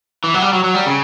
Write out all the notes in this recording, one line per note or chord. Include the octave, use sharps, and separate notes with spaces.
E3
F#3
G3
F#3
F#3
G3
C#3